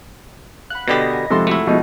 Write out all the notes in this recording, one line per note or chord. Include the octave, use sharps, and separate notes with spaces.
F5 F#5 B5 F#6
B2 D3 G4 D#5 F5 B5 A#6
A#4 G#5
C3 F3 G#3 A4 C6
A3 E4 F#4 G#4 A#4
B2 F3 G#3 D#4